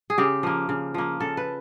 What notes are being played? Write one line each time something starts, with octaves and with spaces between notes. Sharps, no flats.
G#4
C#3 G4
F3 A#3
C#3
F3 A#3
C#3 A4
B4